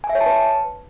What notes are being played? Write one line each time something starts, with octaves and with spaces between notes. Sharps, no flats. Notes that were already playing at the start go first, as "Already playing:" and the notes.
G#5
E5
C#5
A5
B4